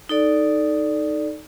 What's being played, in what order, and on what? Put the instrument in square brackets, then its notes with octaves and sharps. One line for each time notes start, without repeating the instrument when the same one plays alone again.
[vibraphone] D#4 A4 D5